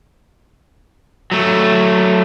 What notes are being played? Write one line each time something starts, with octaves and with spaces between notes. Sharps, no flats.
F#3 A3